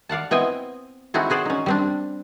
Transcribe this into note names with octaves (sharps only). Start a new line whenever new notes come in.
D5 F5 F#5 A5
B3 C4 E4 D#5 G5 G#5
C4 D#4 E4 F#4 G#4 A4
F#4 G#4 C5 D5
C#4 D#4
G3 C4 D4